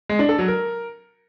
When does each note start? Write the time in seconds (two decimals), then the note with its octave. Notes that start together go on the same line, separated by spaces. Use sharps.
0.09 G#3
0.19 D4
0.29 A4
0.38 F#3
0.48 A#4